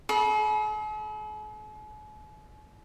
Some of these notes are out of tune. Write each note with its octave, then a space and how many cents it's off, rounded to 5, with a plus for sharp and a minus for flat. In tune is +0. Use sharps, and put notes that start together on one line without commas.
G#4 +45 B5 -40